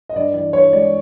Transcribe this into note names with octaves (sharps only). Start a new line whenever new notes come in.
D#5
G2 D5
E3 D5
G2 C#5
G#3 D5